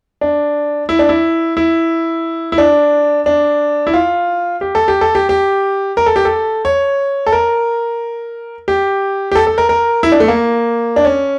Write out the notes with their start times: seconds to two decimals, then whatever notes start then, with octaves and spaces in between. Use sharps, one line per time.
0.21 D4
0.89 E4
0.99 D4
1.09 E4
1.57 E4
2.52 E4
2.58 D4
3.26 D4
3.87 E4
3.94 F4
4.61 G4
4.75 A4
4.88 G4
5.01 A4
5.15 G4
5.29 G4
5.97 A#4
6.06 A4
6.16 G4
6.25 A4
6.65 C#5
7.27 A4
7.32 A#4
8.68 G4
9.32 G4
9.35 A4
9.47 A4
9.58 A#4
9.69 A#4
10.03 E4
10.12 D4
10.20 A3
10.28 A#3
10.96 D4
11.05 C#4